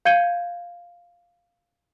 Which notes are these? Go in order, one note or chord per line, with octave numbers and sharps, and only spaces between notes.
F5 G6 G#6 C#7 D#7 G7